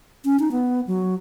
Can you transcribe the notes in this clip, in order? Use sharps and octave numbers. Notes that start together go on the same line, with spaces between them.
C#4
D#4
B3
F#3